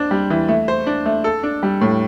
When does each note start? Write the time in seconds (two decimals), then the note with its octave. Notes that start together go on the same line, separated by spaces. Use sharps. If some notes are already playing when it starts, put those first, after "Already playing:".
Already playing: D4 C5
0.11 G3
0.30 E3
0.48 A3
0.68 C5
0.87 D4
1.06 A3
1.24 A4
1.43 D4
1.63 G3
1.81 A2